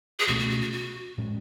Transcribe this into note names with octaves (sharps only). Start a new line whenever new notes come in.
G#4
C#2 B2 A3 C#4 F#4
F#4
F#4
F#4
F#4
A2 G#3 C#4